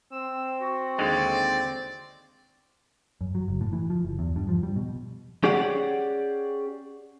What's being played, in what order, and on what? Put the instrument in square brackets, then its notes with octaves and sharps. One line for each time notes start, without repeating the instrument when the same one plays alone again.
[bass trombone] C4 [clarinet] E6
[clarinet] F#4
[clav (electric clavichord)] D#2 D3 G#3 [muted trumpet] D5
[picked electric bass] F#2
F#3
F#1
A2
E3
F3
F#1
E2
G2
F3
G3
B2
[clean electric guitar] C#4 G4 G#4 D5 F#5